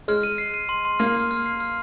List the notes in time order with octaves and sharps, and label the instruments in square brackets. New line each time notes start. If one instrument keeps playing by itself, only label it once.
[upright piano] G#3 [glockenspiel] F6
[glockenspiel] D#7
C7
D#7
C6
C6
[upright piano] A#3 [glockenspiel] F6
[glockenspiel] F6
F6
C7
F6